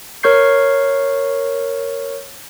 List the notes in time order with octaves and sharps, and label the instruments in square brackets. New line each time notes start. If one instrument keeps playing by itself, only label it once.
[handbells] A#4 C#5 C#6 G6 C7